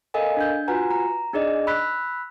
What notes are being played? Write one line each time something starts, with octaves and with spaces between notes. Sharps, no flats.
A4 A#4 D#5 F5 G#5
D4 G6
F4 F#4 B4 F#5 G#5 A#5
A#5
D4 D#4 G#4 D5 D#5
B5 E6 F#6 B6